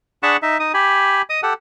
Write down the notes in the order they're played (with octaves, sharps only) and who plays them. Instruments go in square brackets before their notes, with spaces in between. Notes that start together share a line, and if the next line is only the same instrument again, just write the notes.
[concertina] D4 G#4 F#5 A5 B5 C#6
D#4 E5
D#4 D#6
G4 G#5 B5
D#5 D#6
G4 A4 F#5